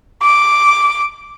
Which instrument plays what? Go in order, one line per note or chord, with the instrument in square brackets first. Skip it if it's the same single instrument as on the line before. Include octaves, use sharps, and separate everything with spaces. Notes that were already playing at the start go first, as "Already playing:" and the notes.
[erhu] D6